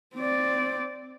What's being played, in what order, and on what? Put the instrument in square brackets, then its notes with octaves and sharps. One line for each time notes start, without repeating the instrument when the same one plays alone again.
[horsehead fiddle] C4 D5